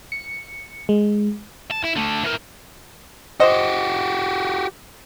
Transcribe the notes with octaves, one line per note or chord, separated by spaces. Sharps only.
C#7
G#3
A5
E4
D3 A3
E3 A#4
F#4 G4 C5 D#5